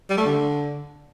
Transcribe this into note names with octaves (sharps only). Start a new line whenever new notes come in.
G3
A3
D3